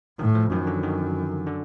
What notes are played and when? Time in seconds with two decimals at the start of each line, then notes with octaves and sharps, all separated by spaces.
0.19 A2 D#3
0.35 F3
0.52 F#2 D#3
0.67 D3
0.83 D#3
1.46 D3